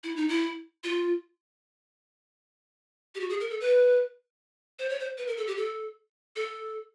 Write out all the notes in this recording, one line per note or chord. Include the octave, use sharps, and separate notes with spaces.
E4
D#4
E4
F4
G4
F#4
G#4
A#4
A4
B4
C5
C#5
C5
B4
A#4
A4
G4
A4
A4